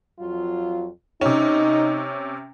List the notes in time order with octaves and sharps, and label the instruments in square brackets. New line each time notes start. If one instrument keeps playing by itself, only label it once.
[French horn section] F2 F#3 F4
[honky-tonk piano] C3 C#4 [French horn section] D#4